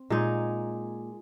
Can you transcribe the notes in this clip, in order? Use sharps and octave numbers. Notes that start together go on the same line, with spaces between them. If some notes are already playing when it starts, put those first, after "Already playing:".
Already playing: C4
A#2 G#3 D#4